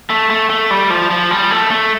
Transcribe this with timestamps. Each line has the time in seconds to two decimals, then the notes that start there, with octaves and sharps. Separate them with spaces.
0.10 A3
0.30 A3
0.49 A3
0.71 G3
0.90 F3
1.11 F3
1.31 G3
1.51 A3
1.70 A3